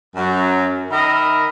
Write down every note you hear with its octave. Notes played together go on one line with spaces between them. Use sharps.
F#2 F#3
D#3 A#4 D#5 E5 B5